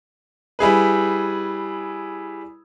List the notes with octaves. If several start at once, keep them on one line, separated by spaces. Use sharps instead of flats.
G3 E4 G#4 B4